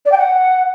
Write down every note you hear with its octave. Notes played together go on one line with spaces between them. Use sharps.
D5
G5
F#5